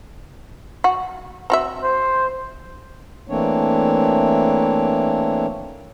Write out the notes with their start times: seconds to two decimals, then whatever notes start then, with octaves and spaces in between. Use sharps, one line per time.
0.84 F#4
1.50 C4 F#4 E5
1.83 C5
3.29 E3 A3 A#3 C4 D4 C#5